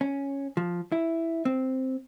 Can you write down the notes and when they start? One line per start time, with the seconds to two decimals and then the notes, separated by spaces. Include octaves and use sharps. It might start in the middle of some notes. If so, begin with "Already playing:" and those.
0.01 C#4
0.57 F3
0.92 E4
1.45 C4